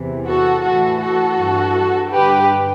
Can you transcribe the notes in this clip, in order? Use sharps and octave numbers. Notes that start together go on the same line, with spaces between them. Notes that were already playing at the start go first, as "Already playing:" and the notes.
Already playing: E2 C3 E3
F#4 A4
A2 E3 F#4 A4
F#4 A4
G2 E3
G2 D3 G4 B4